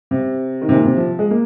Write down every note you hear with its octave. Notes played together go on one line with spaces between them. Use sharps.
C3
D#3
C3
A#2
C3
F3
G#3
A#3